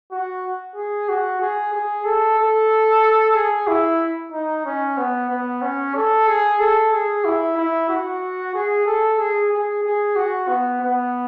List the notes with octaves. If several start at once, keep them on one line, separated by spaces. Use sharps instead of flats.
F#4
G#4
F#4
G#4
G#4
A4
A4
G#4
E4
D#4
C#4
B3
B3
C#4
A4
G#4
A4
G#4
E4
E4
F#4
G#4
A4
G#4
G#4
G#4
F#4
B3
B3